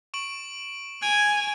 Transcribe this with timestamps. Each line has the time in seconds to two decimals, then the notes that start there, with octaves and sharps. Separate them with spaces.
0.14 C#6 D7 F#7
1.02 G#5 G#6 D7 F7